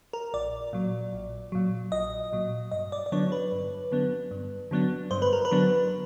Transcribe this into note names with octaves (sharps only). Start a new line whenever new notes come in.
A#4
A#1 D5
A#2 F#3
A#1
A#2 F#3
A#1 D#5
A#2 F#3
G2 D#5
D5
D5
D3 F#3 B3 D4 C#5
B4
G2
D3 F#3 B3 D4
G2
D3 F#3 B3 D4
G2 C5
B4
A#4
B4
D3 F#3 B3 D4